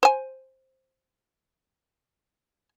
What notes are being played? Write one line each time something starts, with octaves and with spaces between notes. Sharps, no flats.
C5 G#5